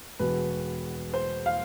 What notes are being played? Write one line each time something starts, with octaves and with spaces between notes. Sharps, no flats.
E1 E2 B2 B4
C5
F5